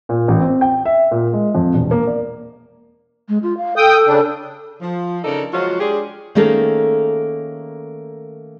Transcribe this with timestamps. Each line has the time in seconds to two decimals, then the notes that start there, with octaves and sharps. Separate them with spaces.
0.09 A#2
0.28 A1
0.40 C4
0.61 G5
0.85 E5
1.11 A#2
1.33 G#3
1.55 F2
1.74 E1
1.91 A#3
2.07 D5
3.29 G#3
3.43 F4
3.57 F5
3.77 A4 G5 D#6
4.07 C#3 D4
4.81 F3
5.24 C#3 D4 D#4 A4 A#4
5.52 F3 F#3 G#3 F4 F#4
5.80 G#3 D4 G4 G#4
6.35 D#3 A3 A#3 C#4 G#4 A4